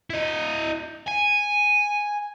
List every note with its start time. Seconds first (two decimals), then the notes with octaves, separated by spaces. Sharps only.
0.10 E4 D#5
1.07 G#5